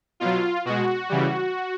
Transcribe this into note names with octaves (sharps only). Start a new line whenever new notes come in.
B2 F#3 F4
B2 G#3 F#4
C#3 E3 G3